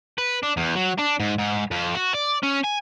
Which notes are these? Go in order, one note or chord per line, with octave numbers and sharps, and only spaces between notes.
B4
D4
E2
F#3
D4
G#2
G#2
F2
F#4
D5
C#4
G#5